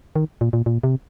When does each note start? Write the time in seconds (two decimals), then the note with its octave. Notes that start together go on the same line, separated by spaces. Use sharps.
0.16 D#3
0.41 A#2
0.53 A#2
0.66 A#2
0.83 C3